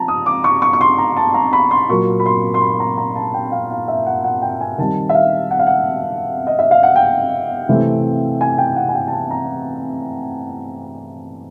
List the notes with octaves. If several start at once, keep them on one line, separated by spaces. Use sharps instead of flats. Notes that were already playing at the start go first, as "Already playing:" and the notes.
Already playing: F3 A5 A#5
D#6
D6
C#6
C#6
C#6
C6
A#5
A5
A#5
B5
C6
A#2 F#3 A#3 C#6
B5
C6
C6
B5
A#5
A#5
A5
G5
F5
F5
E5
F#5
F#5
G5
G#5
D#3 G3 C4 A5
E5
F5
F#5
F5
F#5
D#5
E5
F5
F#5
G5
C3 E3 A3 C4
G#5
G5
F#5
G#5
G5
A5
G#5
A#5